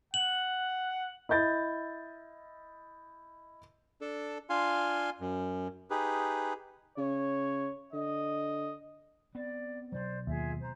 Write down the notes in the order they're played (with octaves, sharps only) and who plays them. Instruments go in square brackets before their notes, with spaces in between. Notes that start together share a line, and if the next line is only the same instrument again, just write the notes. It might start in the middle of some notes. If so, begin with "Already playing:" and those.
[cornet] F#5 [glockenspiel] F#7
[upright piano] E4 D#5 G6 A6
[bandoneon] D4 A4
D4 F4 F5 G#5 C6
F#2
D#4 G4 G#4 B4
[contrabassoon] C#3 [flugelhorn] C#5
[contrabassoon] D3 [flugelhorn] D#5
[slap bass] B3 C4 [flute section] D5
[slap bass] B2 F#3 [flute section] C5 D5
[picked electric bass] D#2 [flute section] F4 G#4 E5
[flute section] C5 A#5